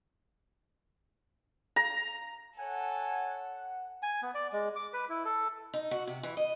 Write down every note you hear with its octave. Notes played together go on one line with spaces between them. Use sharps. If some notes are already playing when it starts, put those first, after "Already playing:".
A#5
A4 C#5 F#5 G#5
G#5
B3
D5
G#3
D6
B4
E4
A4
D#4
F#4
C3
E3
D#5